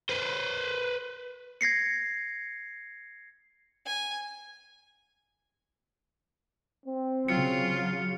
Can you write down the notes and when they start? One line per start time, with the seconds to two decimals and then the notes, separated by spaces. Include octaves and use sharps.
0.09 B4 C5
1.61 G#6 A#6 C7 C#7
3.86 G#5
6.86 C4
7.28 C#3 F#3 F4 C#7